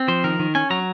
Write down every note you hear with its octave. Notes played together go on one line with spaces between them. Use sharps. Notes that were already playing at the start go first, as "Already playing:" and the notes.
Already playing: C4
F3 C5
D#3 A#4
D#3
C#4 G#5
F#3 A#5